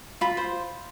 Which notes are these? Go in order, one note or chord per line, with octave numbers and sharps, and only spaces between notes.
F4 B5
C5